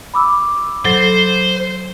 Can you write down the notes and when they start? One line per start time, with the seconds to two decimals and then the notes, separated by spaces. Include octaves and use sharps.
0.14 B5 D6 E6
0.85 F#3 A4 C5 A6